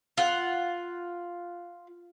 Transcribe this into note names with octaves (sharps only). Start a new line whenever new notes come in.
F4 F#5